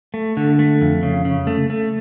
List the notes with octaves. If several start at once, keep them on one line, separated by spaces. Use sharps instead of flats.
A3
D3
A3
F2
C#3
C#3
A3
A3